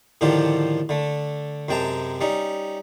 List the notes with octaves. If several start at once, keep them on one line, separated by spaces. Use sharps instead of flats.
A2 D3 D#3 F3 F4 G4
D3 A3
F#2 C3 G#3 G5 A5 A#5
G3 C#4 D#4